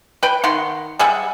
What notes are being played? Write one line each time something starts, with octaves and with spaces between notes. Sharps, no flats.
B4 G5
D#3 F#5 C6
G3 G#4 E5 F#5